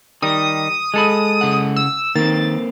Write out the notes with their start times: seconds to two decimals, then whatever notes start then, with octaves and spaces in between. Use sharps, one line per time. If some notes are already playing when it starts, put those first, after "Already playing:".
0.22 D#3 G3 D#4 D#6
0.94 G#3 A4 B5
1.41 C#3 F#5
1.76 E6
2.16 D#3 A#3 C4 A6